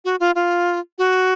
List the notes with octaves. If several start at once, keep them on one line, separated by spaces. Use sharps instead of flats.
F#4
F4
F4
F#4